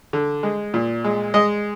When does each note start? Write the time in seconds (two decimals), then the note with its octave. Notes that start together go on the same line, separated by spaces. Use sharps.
0.13 D3
0.43 G#3
0.74 A#2
1.04 G#3
1.34 G#3 D#5